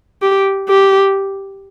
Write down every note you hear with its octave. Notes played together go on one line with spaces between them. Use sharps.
G4
G4